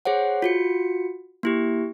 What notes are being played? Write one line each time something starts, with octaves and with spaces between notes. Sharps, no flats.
G#4 C5 C#5 F#5
F4 F#4 C#7
A#3 E4 G4